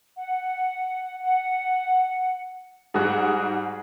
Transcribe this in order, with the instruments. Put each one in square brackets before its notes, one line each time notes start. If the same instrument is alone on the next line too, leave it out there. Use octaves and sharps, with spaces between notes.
[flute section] F#5
F#5
[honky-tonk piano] G#2 G3 F#4 [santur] G#4 F#5